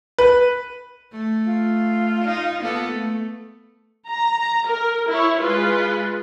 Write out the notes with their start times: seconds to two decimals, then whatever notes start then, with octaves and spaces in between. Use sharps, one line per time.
0.18 B4
1.12 A3
1.47 F4
2.25 D#4
2.61 A#3 B3 A4
2.91 A3
4.10 A#5
4.69 A#4
5.09 E4 C#5
5.42 G#3 F4 B4